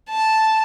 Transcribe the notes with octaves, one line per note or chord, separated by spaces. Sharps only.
A5